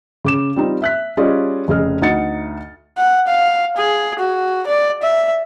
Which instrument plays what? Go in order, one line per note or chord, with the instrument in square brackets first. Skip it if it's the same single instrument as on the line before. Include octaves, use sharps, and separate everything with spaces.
[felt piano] C#3 D6 E7
G3 C4 D#4 F4
E5 F#6 B6
G3 C#4 F4 G#4 D5 D#5
F1 C#3 G#4 D#5 F6
D2 D#4 D#5 F#5 A6 C#7
[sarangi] F#5
F5
G#4
F#4
D5
E5